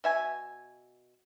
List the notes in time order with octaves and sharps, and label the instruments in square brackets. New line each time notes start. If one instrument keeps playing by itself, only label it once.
[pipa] B2 E5 G#5